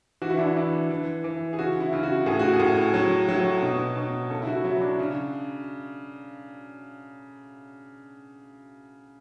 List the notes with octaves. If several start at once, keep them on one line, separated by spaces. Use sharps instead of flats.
E3 F#4
E4
D4
E4
E3
E3
E3
G#4
C#3 F#4
E4
C#3
F#4
A2 G#4
F#4
G#4
A2
F#3
F#3
B2
B2
C#3 A4
E4
F#4
F#3 E4
D4
C#3